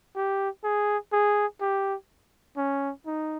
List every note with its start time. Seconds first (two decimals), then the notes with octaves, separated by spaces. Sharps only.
0.15 G4
0.64 G#4
1.12 G#4
1.61 G4
2.57 C#4
3.06 D#4